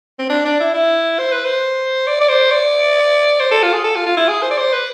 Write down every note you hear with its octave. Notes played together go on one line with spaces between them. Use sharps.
C4
D4
D4
E4
E4
C5
B4
C5
D5
D5
C5
D5
C5
A4
F4
G#4
A4
F4
F4
E4
G#4
C5
D5
C5
B4